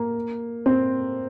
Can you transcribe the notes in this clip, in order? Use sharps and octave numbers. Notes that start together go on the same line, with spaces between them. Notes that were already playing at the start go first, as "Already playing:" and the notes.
Already playing: A#3
C4